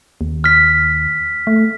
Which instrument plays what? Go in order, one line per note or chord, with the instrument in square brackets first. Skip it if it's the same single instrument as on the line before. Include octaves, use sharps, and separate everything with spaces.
[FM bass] D#2
[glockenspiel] F6 B6
[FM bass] A3